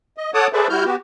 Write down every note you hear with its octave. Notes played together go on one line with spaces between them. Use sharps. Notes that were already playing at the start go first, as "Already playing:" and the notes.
D#5
A4 C#5 F#5 A5 D6 D#6
G#4 A4 B4 C5 D5 E5
G3 E4 F#4 F6 G6
B3 F#4 G4